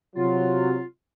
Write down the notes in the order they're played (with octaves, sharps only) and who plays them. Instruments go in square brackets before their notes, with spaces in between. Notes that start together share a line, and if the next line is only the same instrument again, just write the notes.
[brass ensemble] C3 F#3 [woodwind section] F4